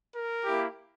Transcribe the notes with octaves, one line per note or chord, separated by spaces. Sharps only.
A#4
A#3 E4 G4